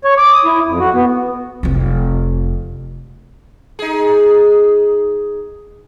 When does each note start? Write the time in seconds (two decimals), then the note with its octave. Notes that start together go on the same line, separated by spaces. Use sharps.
0.04 C#5
0.17 D6
0.33 D#6
0.45 E4
0.67 F2
0.80 F#4
0.94 B3
1.63 F1 C4
3.79 D#4 G#4